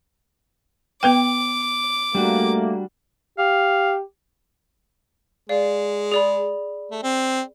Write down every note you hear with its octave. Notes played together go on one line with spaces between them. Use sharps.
B3 B4 G5 D6
G3 A3 A#3 D4 F#4
G4 F5
G#3 D5 F5
G#4 D5 B5
A3
C4